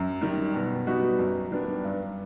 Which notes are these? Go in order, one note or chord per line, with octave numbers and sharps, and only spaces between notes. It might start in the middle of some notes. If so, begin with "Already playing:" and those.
Already playing: F#2
D#3 G3
B2
G3 B3 D#4 F#4
F#2
D#3 G3 B3 D4
G2